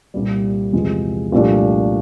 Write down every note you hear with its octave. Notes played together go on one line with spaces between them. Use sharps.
C2 A#2 G3
E2 C3 F3 G#3
C2 A#2 F3 A3 D4